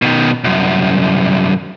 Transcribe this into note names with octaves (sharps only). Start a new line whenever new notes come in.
B2 D#3
C2 F#2